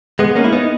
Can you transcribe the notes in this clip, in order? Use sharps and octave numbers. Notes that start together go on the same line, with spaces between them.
G#3 B3
A#3 C#4
E4
B3 D#4